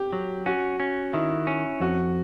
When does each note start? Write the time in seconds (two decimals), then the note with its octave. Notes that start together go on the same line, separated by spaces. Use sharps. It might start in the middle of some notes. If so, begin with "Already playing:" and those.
Already playing: G4
0.13 F#3
0.46 C#4 F#4
0.80 C#4
1.13 D#3 E4
1.47 C#4
1.80 F2 F#4